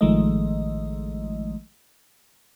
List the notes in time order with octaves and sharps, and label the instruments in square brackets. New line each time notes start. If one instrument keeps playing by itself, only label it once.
[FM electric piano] A1 D#3 F3 G#3 A3 D#5